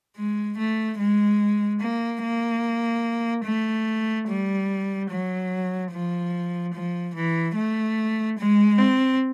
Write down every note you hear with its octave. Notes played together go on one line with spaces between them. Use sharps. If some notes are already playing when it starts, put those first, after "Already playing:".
G#3
A3
G#3
A#3
A#3
A3
G3
F#3
F3
F3
E3
A3
G#3
C4